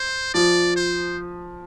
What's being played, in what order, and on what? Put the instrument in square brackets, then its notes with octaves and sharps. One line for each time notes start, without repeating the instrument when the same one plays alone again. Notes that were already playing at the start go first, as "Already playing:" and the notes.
Already playing: [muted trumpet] C5
[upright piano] F3 [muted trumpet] D5
[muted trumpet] C5